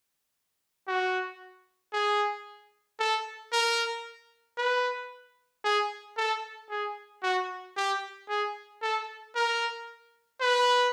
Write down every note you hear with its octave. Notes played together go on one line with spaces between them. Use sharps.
F#4
G#4
A4
A#4
B4
G#4
A4
G#4
F#4
G4
G#4
A4
A#4
B4